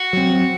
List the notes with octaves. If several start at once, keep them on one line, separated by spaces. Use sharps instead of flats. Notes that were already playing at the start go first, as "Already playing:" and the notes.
Already playing: F#4
F#3 C4